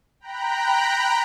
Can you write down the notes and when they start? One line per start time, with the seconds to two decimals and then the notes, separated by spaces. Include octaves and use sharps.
0.20 G5 A#5 B5 F#6